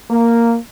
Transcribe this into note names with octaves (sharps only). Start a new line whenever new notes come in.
A#3